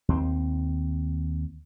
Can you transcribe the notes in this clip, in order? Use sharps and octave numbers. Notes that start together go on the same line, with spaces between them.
D#2 C4